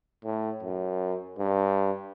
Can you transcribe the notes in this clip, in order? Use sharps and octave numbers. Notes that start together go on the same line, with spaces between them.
A2
F#2
G2